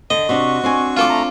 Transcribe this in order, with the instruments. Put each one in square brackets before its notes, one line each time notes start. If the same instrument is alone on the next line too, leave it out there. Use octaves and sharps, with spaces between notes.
[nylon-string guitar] D3 [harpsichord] D#5
[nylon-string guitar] C3 D4 [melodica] F#4 C#6
[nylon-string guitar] C4 D4 G#5
[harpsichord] F4 A4 D6
[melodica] A3 A#5